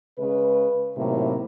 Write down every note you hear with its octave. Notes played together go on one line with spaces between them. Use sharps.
C#3 G#3 B4
A2 C3 D#3 F#3 A#3